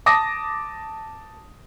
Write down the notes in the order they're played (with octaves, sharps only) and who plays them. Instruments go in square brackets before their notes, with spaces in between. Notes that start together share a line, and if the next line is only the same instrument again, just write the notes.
[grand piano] A5 D6 D#6 A#6